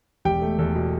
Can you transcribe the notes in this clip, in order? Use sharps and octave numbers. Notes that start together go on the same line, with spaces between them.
E1 G4 G5
A3
E2 A4
B2